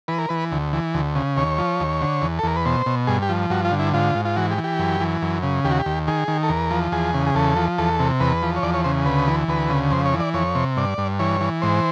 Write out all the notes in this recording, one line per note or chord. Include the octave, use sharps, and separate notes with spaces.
E3 B4
A#4
E3 B4
D2
E3
D2
C#3
D#2 C#5
F3
D#2
D3
E2
A4
E2 A#4
B4
B2 C5
B2
G2 G#4
G4
F3
G2 F#4
F4
D3
E4
G#2 F4
G#2
F4
E3 F#4
G4
E3
G4
F#2
E3
F#2
C#3
D#2 G4
F#4
G4
D#2
D#3 G#4
D#3
A4
E2 A#4
F3
E2 G#4
C#3
G#4
E2 A4
F3
E2 A4
C3
E2 B4
F3
C#5
E2 D5
C#5
C#3 C5
D2 B4
E3
D2 B4
C#3
F2 C5
C#5
E3
D5
F2 C#5
C3
G2 D5
G2
E3 C#5
E3
G#2 C5